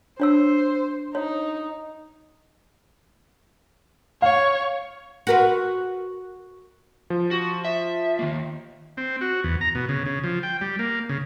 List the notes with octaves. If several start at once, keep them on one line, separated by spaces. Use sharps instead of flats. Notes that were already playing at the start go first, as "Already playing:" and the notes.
D4 C5 C#5 E6
D#4 C#5
C#5 F5
F#4 A#4 B4
F3
F#4
E5
D#3 A#3
C4
F#4
E2
A#5
B2
C#3
C#3
F3
G5
G3
A#3
C#3